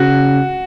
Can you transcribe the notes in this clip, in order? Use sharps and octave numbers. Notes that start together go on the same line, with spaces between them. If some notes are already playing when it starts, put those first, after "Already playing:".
Already playing: C#3 F#4